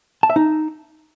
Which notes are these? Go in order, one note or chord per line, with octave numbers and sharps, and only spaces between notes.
A5
E5
D#4